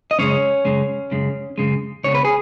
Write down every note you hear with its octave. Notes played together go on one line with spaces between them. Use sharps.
D#5
F#2 C#3 G#3 C#4 C#5
F#2 C#3 G#3
F#2 C#3 G#3
F#2 C#3 G#3
C#2 C#3 B3 C#5
B4
G#4